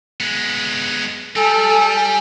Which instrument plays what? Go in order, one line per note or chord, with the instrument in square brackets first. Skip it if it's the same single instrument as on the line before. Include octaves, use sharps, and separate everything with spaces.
[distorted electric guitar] G#3 B3
[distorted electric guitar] G3 [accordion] A4 [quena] G#5